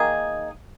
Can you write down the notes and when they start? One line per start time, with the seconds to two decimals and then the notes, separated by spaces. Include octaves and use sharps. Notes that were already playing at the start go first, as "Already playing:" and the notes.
Already playing: D#3 A#3 D#4 G#4